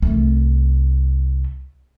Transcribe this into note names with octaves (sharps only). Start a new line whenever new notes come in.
C2 A3